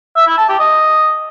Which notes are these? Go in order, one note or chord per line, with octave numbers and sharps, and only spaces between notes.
E5
E4
A5
G4
D#5